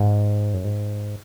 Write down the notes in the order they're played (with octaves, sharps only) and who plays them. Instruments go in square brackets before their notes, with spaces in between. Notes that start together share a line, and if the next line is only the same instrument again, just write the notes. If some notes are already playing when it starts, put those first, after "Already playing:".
Already playing: [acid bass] G#2
F#2
G#2